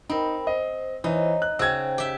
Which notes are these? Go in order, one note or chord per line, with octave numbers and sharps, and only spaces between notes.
C4 D#4 A#4 G5 B5
C5 D#5
E3 D#4 C5 C#5
F#6
C#3 F#4 C5 G5 E6 G#6
G4 E5